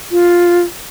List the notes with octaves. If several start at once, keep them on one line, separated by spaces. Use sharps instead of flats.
F4